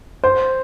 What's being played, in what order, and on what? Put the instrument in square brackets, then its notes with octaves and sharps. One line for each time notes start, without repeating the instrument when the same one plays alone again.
[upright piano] C5